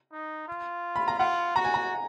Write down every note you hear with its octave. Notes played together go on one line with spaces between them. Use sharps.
D#4
F4
B5
A#5
F4 F#5
F#4 A#5
G#5
A#5